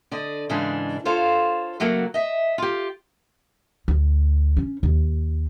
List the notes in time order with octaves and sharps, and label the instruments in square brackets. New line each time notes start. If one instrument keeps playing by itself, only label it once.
[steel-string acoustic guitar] D3 D5 D#5
G#2 C#3 E3 G#3 D4
F4 A4 C5 C#5 F5
C#3 F#3 A3 A#3 F#4
D#5 E5
F4 G4
[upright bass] D2
C#4
D#2